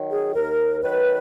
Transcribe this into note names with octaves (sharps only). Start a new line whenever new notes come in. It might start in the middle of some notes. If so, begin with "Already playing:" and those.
Already playing: D#3 F#3
G#4
D#2 A#4
D#3 F#3 B4